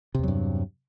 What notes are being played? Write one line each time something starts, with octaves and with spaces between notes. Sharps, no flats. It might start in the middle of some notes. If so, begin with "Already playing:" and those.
E2 G2 C3 F#3